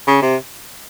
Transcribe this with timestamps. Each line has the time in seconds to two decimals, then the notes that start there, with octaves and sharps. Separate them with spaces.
0.07 C#3
0.22 C3